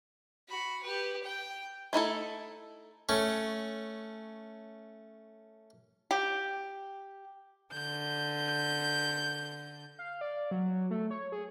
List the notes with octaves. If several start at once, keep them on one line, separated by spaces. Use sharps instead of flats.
F#4 B5
G4 B4
G5
A3 D#4 E4 A4
A3 C#4
G4
D3 G6
F5
D5
F#3
A3
C#5
G#4